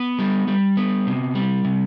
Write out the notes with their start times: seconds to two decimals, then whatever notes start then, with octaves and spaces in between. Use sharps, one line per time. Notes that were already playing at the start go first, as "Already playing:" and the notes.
Already playing: B3
0.19 G3
0.47 G3
0.77 B3
1.07 C3
1.35 G3
1.65 C3